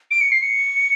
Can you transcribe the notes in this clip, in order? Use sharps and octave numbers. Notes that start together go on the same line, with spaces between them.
D7
C#7
C7
C#7